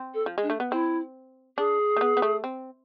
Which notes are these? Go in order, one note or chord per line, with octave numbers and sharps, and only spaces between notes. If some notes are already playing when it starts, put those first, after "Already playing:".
Already playing: C4
A4
F3
G#3
D4
A3
B3
C4 E4
D4 G#4
A3
B3
B3
A3
C4